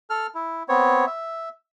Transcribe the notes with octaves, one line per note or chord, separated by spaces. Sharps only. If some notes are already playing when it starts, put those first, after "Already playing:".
A4 F6
E4
B3 C4 C#5
E5